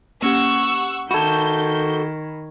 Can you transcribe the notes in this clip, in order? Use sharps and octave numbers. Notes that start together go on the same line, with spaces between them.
A#3 C#4 G4 F#5 C#6 E6
D#3 F#4 A4 B5 C#6 G6 G#6